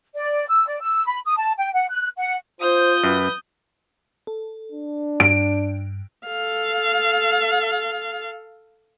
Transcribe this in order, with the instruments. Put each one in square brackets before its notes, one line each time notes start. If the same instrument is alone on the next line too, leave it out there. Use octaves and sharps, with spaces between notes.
[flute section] D5
E6
D5
E6
B5
D#6
A5
G5
F#5
F#6
F#5
[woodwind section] F4 [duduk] C5 [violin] D#6 G6
[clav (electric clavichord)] F#2 [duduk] B4
[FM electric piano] A4
[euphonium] D4
[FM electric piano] G2 [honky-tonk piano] D7
[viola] A4 F5